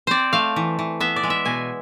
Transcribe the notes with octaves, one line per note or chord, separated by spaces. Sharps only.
C4 C5 D5
A3 F5
E3
E3
B3 E5
D5
G#3
E5
B2 G#5